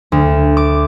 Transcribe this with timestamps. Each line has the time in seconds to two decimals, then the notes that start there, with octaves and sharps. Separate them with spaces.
0.12 D2
0.57 D6